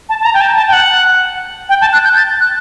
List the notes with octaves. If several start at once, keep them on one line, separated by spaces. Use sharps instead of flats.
A5
A5
A#5
G5
A5
A5
G5
F#5
G5
A5
F#6
G6
A6
F#6